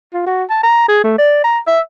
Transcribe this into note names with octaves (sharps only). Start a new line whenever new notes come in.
F4
F#4
A5
A#5
G#4
A3
D5
A#5
E5